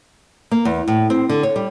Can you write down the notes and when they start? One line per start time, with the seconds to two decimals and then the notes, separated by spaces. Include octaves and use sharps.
0.51 A#3
0.65 E2
0.88 A2
1.10 C4
1.29 D3
1.43 C#5
1.56 G3